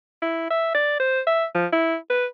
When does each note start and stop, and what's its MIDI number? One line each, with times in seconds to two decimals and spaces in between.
0.22 0.46 64
0.50 0.72 76
0.74 0.97 74
1.00 1.20 72
1.27 1.45 76
1.55 1.66 53
1.72 1.96 64
2.10 2.26 71